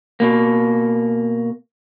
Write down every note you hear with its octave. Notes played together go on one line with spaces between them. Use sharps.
B2 A#3